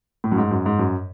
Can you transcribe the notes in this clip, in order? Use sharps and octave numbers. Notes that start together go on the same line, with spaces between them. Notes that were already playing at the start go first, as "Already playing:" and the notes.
A2
F#2
G#2
F#2
G#2
F#2